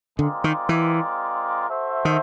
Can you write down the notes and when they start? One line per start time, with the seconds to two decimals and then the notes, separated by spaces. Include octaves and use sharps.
0.19 D3 G#3 C4 F4 A#4 D5
0.44 D#3
0.69 E3
1.69 F#4 A4 C5 E5
2.05 D#3